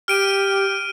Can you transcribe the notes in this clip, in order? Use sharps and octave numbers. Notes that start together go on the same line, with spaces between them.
G4 F6 D7 D#7